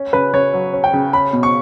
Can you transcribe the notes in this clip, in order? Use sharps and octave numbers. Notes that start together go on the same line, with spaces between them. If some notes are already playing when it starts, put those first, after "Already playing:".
Already playing: C#4
C#3 B4
C#3 C#5
F#3
C#4
G5
C#3
C#4 B5
B2
C#6